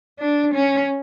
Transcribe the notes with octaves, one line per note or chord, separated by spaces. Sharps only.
D4
C#4